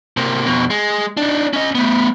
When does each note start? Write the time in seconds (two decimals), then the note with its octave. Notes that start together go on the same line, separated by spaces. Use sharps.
0.17 C3 A#3
0.46 F2 B2
0.70 G#3
1.17 D4 D#4
1.53 C#4 D#5
1.75 A3 B3